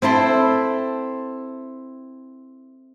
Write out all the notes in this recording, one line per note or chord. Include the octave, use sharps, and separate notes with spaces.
C4 E4 A4 C6